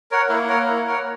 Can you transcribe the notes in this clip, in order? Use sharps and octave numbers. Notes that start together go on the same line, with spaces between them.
A#4 C#5 F#5
A#3 E4
A#4 C#5 F#5
E4
A#4 C#5 F#5